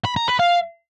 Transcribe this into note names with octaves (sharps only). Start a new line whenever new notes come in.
B5
A#5
B4
F5